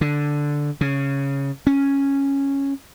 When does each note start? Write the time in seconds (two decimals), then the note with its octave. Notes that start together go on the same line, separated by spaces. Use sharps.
0.01 D3
0.81 C#3
1.67 C#4